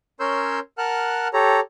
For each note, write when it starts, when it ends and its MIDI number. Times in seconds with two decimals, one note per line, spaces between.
0.20 0.59 61
0.20 0.59 70
0.20 0.59 73
0.20 0.59 84
0.20 0.59 88
0.20 0.59 91
0.78 1.28 70
0.78 1.28 78
0.78 1.28 81
0.78 1.28 89
0.78 1.28 90
1.33 1.60 67
1.33 1.60 69
1.33 1.60 73
1.33 1.60 82